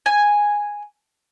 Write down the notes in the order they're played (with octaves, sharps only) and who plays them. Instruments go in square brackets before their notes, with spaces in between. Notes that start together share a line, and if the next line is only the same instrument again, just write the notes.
[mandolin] G#5